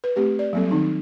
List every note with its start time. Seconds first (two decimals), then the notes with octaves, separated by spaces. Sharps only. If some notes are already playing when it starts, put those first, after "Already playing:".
0.04 B4
0.16 A3 C4 G4
0.39 D5
0.53 F#3 G3 A#3 C4 A4
0.71 D#3 C4 D#4